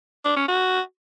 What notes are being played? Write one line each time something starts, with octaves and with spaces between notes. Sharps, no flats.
D4
C#4
F#4